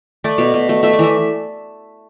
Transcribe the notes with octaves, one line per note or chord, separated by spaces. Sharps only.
A3 D5
B2
B2
A3
A3 E5
D5
E3 E5